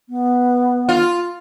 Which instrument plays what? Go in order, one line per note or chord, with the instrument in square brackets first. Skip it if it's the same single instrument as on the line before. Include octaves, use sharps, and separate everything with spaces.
[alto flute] B3
[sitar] F4